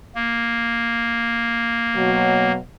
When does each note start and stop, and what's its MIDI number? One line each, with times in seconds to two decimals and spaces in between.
0.15 2.52 58
1.95 2.57 47
1.95 2.57 54